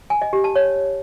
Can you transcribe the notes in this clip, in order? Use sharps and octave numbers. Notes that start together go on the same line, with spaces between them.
G#5
D#5
G4
A5
C#5